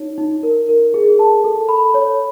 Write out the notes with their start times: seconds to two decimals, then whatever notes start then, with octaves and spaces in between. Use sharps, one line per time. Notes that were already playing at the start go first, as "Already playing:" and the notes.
Already playing: D#4 C#5
0.18 D#4
0.43 A#4
0.69 A#4
0.94 G#4
1.19 A5
1.44 A4
1.69 B5
1.94 C#5